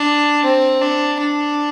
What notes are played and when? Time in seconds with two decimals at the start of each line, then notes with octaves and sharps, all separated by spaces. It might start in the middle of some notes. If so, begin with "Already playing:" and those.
Already playing: D4
0.44 C4
0.82 D4
1.19 D4